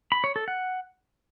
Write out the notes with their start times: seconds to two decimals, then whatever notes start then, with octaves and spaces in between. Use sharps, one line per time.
0.12 B5
0.24 C#5
0.36 A4
0.48 F#5